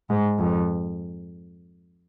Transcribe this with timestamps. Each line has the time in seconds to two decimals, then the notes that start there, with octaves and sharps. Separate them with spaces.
0.10 G#2
0.39 F2